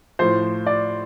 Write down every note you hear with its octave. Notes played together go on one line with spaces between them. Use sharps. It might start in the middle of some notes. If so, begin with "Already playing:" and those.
A2 F3 C5
D5